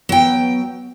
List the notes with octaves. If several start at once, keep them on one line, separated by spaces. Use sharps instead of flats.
F#3 B3 G5